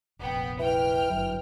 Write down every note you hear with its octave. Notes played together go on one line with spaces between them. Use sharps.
F1 A#1 B3 G5
E3 G5 F6
G1 F#2 E3 F#3